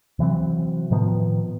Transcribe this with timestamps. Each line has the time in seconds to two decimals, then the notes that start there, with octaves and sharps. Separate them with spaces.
0.19 C3 E3 F#3 C4
0.91 A2 D#3 F3 B3